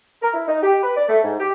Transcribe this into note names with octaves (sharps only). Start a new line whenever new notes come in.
A#4
E4
D#4
G4
B4
D5
A3
G#2
G4